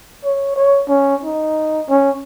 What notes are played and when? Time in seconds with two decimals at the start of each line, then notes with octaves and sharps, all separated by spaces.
0.24 C#5
0.56 C#5
0.88 C#4
1.24 D#4
1.89 C#4